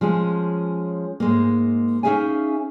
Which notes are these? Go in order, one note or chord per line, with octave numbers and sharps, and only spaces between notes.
F3 G#3 C#4 G#4
G#2 G#3 A#3
C#4 D#4 G#4 E5 F5 G#5